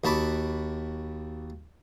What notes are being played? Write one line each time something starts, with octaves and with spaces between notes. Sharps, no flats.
D#2 F#4 A5 B5 D6